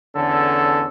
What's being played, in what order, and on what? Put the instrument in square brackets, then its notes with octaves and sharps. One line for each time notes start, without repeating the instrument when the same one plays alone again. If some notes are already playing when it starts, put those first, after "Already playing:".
[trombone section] E2 D3 C#4 A4